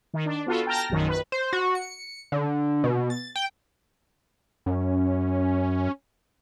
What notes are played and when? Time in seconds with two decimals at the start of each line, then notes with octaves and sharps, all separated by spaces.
0.14 D#3
0.26 D4
0.47 B3 F4 F#4 A4
0.67 G5 A5 A#5 F6 A#6
0.90 A#1 F#2 D#3
1.09 B4
1.32 C5
1.53 F#4
1.75 C#7
2.32 D3
2.84 B2
3.10 A6
3.36 G5
4.66 F#2 C#4